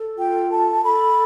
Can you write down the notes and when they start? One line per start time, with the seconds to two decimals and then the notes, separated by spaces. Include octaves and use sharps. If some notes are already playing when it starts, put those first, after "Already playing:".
Already playing: A4
0.17 F4 G5
0.49 A4 A5
0.83 A4 B5